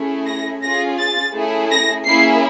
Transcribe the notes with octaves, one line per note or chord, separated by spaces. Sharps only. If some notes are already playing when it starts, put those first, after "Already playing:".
Already playing: A3 C#4 E4 G#4
A#6
C#4 F4 G#4 A#6
A6
A3 C#4 E4 G#4
A#6
A#3 C#4 E4 G#4 C7